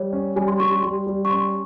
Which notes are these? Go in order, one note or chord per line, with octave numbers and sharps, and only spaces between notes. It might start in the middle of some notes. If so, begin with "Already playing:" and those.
Already playing: G3 C#5
C#4
G3 G#5
C6
G3 C#6
C6
G3 C6
G3
C#6
C#4 C6